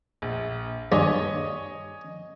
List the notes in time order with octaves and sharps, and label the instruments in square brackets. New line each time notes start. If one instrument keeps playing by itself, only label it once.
[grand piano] A#1
[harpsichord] G2 A#2 D4 [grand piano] C#5 D#5 G#5